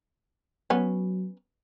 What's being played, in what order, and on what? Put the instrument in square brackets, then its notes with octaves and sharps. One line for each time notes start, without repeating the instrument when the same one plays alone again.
[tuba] F#3 [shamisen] B3 C#4